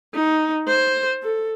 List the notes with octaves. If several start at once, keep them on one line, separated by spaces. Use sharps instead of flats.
D#4
C5
A4